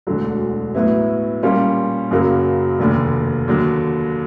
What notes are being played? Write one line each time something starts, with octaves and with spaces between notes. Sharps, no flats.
E1 D2 D3 F#3
A2 F#3 B3 E4
A#2 G3 A#3 C#4 F4
F#2 C#3 F#3 A#3
F1 D#2 D3
D#2 D3 F#3